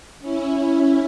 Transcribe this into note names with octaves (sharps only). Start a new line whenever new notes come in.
C#4 E4